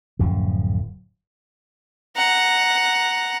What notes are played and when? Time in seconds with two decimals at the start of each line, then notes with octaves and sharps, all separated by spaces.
0.19 D1 F#2 F3
2.17 F#5 A#5